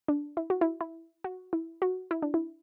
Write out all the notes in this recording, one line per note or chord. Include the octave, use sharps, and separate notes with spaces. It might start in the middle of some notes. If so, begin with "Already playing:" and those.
D4
E4
F#4
E4
E4
F#4
E4
F#4
E4
D4
E4